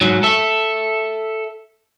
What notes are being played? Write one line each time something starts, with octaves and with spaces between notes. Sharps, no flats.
G#2 F#3
A4 E5